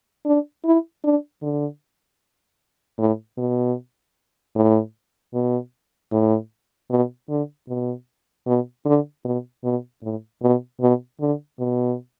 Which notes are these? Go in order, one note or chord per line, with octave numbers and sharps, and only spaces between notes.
D4
E4
D4
D3
A2
B2
A2
B2
A2
B2
D3
B2
B2
D3
B2
B2
A2
B2
B2
D3
B2